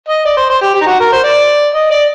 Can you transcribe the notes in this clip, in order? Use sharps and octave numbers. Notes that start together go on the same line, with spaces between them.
D#5
D5
C5
C5
G4
G4
D#4
F#4
A#4
C5
D5
D#5
D5